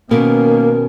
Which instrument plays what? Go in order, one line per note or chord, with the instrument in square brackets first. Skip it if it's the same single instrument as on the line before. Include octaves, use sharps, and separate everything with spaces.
[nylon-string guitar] B2 B3 [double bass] D#3 C#4 [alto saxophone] A#3 [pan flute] A#4